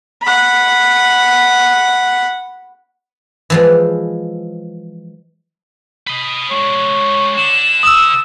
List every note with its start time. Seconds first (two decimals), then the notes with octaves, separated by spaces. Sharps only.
0.22 F#5 B5
3.50 E3 F3 G#3
6.07 B4 D#5
6.51 G#3 D4 C#5
7.37 D3 E7
7.83 D#6 E6